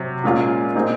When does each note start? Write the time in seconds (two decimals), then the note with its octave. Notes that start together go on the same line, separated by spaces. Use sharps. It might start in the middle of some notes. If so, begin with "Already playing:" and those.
Already playing: C3 F#3
0.24 A#2 G#3 C#4 F4
0.75 A#2 G#3 C4 D#4